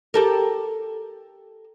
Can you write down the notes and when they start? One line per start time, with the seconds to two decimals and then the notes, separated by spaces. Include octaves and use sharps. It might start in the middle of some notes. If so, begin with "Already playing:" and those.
0.14 G4 A4 A#4